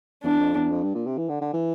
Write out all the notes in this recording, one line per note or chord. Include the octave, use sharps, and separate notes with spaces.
E2 D4
F2
E2
F2
G2
A#2
C3
E3
D3
D3
E3